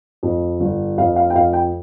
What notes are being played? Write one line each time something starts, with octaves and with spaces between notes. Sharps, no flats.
F2
G1
F2 F5
F5
G5
F2 F5
G5